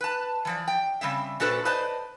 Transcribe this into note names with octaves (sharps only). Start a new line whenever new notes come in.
B4 A5
E3 F3 D5
G5
C#3 G3 C4 E5
A#2 D4 F#4 A4 B4 C5
B4 C5 D5 D#5 A5